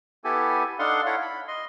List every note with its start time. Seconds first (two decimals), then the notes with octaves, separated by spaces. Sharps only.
0.24 B3 E4 G4 A4 G#5
0.79 D4 D#4 A4 F5 F#5 C6
1.06 E4 A4 C#5 F5 F#5
1.22 B5
1.48 D#5 C6